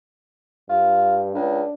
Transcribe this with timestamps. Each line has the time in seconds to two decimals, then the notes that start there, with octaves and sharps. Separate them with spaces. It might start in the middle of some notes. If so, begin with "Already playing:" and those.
0.69 G2 F4
1.35 C#2 D4